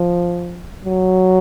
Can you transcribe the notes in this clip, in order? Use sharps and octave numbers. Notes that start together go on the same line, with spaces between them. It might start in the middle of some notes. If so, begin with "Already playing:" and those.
Already playing: F3
F#3